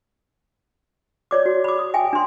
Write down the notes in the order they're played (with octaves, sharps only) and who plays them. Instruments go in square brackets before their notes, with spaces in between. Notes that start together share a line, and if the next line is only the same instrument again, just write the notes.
[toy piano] C#5 D5 D6
F#4
B5 D6
D#6
E5 G5 G#5
D4 C6